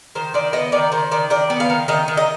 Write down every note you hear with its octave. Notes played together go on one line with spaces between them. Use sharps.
D#3 C5
D#3 D5
B3 D#5
D#3 D5
D#3 C5
D#3 D5
D#3 D5
B3
F5
D#3
D#3 D#5
D#3
D#5